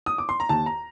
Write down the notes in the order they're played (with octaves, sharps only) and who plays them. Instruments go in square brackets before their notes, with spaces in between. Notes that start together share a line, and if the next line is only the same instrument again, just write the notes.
[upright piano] D#6
D6
C6
A#5
D#2 A5
A#5